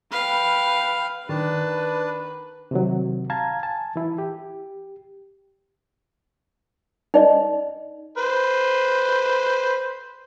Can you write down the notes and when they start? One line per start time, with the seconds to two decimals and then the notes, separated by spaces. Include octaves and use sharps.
0.12 B4 F5 G5
1.29 D#3 D4 B4 A5
2.71 C3 D#3 F#3
3.30 F5 A5 A#5 G#6
3.63 G#5 A5
3.96 E3 E4
4.18 G4
7.14 D#4 D5 D#5
8.17 B4 C5